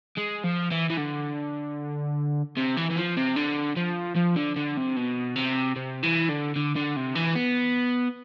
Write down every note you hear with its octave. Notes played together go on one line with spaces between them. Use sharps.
G#3
F3
E3
E3
D3
C3
E3
E3
F3
C3
D3
F3
F3
D3
D3
C3
B2
C3
C3
E3
D3
D3
D3
C3
E3
B3